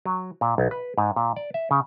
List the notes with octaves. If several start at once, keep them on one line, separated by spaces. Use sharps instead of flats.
F#3
A#2
B1
B4
G#2
A#2
D5
E5
C#3